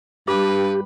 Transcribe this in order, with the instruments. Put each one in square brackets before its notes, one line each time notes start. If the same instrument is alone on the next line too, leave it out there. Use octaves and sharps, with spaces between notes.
[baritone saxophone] G2 [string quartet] G3 [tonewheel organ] G4 [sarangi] B4